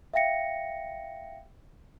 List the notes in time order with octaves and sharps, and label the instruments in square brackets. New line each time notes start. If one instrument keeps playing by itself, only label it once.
[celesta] E5 F5 G5 A#6 C#7